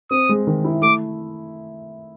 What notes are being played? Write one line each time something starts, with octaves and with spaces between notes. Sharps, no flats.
C4 D#6
G#3
D#3
E4
A3 D6